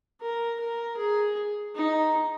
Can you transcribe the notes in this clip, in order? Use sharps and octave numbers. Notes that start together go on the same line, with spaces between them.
A#4
A#4
G#4
D#4